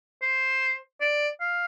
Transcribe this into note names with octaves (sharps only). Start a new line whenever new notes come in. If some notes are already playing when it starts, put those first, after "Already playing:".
C5
D5
F5